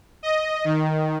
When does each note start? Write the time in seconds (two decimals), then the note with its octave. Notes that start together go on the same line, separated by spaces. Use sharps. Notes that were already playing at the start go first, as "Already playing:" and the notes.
0.23 D#5
0.65 D#3